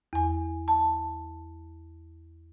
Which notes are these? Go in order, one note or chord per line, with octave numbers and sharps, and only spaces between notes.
E2 G#5
A5